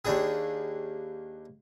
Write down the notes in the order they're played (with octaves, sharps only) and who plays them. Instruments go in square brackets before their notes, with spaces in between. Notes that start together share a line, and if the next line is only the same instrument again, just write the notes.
[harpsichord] D#2 D4 G#4